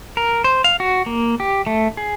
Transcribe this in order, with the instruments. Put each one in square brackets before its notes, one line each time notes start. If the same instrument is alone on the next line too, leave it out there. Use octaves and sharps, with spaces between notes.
[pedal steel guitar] A#4
C5
F5
F#4
A#3
G4
A3
G#4